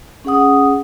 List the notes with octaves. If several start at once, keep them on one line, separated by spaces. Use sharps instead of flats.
C#4 G#4 F#5 D#6